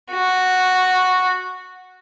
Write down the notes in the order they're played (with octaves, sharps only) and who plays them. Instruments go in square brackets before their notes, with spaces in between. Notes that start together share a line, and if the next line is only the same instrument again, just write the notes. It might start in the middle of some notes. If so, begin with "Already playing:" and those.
[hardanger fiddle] F#4